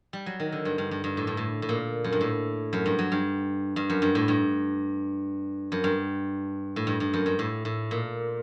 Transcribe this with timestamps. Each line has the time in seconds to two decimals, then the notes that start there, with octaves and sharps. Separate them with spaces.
0.13 G3
0.26 F#3
0.40 D#3
0.52 D3
0.65 G2
0.78 G2
0.91 G2
1.04 G2
1.17 A2
1.27 G2
1.37 A2
1.62 A2
1.69 A#2
2.04 F#2
2.12 G2
2.21 A2
2.73 F#2
2.86 G2
2.99 F#3
3.12 G2
3.76 G2
3.90 F#2
4.02 G2
4.15 A2
4.28 G2
5.72 F#2
5.84 G2
6.76 A2
6.87 G2
7.00 G2
7.14 F#2
7.26 G2
7.39 A2
7.65 A2
7.91 A#2